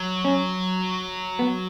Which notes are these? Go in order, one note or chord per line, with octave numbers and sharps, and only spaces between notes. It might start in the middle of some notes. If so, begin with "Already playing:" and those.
Already playing: F#3
C#4
B3